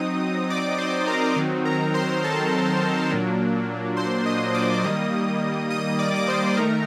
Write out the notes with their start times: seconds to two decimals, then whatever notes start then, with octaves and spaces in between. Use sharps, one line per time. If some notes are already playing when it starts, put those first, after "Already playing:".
Already playing: F#3 C4 D#4 D#5 D#6
0.50 D5 D6
0.78 C5 C6
1.07 A#4 A#5
1.36 D#3 F#3 C4 D#4
1.65 A#4 A#5
1.94 C5 C6
2.24 A4 A5
3.11 A#2 F#3 A#3 D4
3.97 C5 C6
4.26 D#5 D#6
4.54 D5 D6
4.84 D#3 G3 A#3 D#5 D#6
5.70 D#5 D#6
5.88 D#6
5.99 D5 D6
6.16 D6
6.28 C5 C6
6.57 D#3 A3 D#4 A#4 A#5